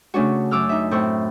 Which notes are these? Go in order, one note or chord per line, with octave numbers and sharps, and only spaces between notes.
C#3 A3 C#4 D4 F#4
F#2 D6 E6 F6
D#4 E5
A2 C4 C#6 E6 F#6